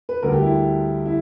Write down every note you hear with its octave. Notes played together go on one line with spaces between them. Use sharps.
B4
D2 D3 G3 A#4
G4
E4
E4